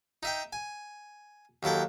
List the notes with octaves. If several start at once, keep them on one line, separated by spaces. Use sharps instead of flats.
D#4 E5 G5
G#5
D#2 F#3 E4 A4 G5